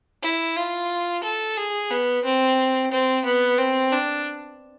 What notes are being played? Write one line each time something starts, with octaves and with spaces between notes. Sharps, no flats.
E4
F4
A4
G#4
B3
C4
C4
B3
C4
D4